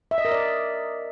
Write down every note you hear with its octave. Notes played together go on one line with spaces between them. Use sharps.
E5
D#5
A#4
D5